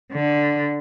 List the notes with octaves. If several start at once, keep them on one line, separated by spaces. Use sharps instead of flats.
D3